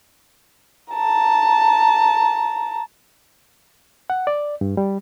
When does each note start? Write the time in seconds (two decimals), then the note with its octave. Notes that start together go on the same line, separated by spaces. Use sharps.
0.93 A5 A#5
4.10 F#5
4.27 D5
4.61 G2
4.77 G3